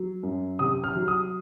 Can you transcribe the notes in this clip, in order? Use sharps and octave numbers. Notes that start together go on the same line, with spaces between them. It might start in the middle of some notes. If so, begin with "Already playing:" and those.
Already playing: F#3
F#2
C3 D#6
F6
F#3
D#6